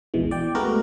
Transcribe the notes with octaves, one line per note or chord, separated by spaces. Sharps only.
A#1 E2 B2 E3 G#3
D5 G5
G#3 A3 B3 F#4 A#4